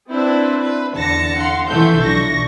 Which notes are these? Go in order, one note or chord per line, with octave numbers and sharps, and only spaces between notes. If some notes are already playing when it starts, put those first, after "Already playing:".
C4 D4 E4 B4 C5
B4
E2 D3 D4 A5 A#6 C#7
F5 F#5 C6
E3 F3 A3 E4 C6 G6
B1 D4 C#6 A#6